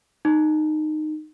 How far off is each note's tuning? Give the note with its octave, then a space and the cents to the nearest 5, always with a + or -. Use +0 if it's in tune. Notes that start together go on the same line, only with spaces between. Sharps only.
D#4 -15